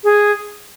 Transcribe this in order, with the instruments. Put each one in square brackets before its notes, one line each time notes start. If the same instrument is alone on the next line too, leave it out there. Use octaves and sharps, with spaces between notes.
[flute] G#4